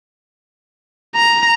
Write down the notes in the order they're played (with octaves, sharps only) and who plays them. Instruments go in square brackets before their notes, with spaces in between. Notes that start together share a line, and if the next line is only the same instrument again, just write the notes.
[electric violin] A#5